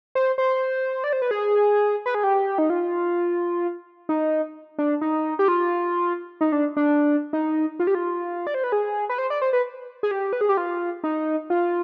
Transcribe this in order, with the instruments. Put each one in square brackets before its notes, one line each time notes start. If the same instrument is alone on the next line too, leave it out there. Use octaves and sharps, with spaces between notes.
[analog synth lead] C5
C5
D5
C5
B4
G#4
B4
G#4
G4
D#4
F4
D#4
D4
D#4
G4
F4
D#4
D4
D4
D#4
F4
G4
F4
D5
C5
B4
G#4
B4
C5
D5
C5
B4
G#4
G4
B4
G#4
G4
F4
D#4
F4